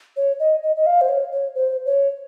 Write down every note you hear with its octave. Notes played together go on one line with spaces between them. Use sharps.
C#5
D#5
D#5
D#5
F5
C5
C#5
C#5
C5
C#5